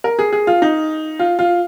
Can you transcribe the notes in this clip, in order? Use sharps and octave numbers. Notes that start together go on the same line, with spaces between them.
A#4
G#4
G#4
F4
D#4
F4
F4